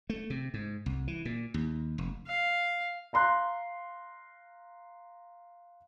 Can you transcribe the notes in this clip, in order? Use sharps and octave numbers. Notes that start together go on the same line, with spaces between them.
A3
C3
G#2
C2
E3
A#2
D#2
F1
F5
F5 A#5 C6 F#6